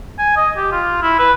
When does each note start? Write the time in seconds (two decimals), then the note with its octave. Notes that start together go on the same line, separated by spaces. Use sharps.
0.19 G#5
0.36 D#5
0.56 G4
0.72 F4
1.03 E4
1.19 B4